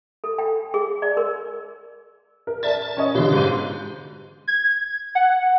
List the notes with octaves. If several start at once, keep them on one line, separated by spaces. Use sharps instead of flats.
A4
G5
G#4
D5
A#4
A#4
A#4 D5 E5 A5 A6
A5
C#4 C#5 D#5
B2 D3 G4 F5
G#2 D#7
G#6
F#5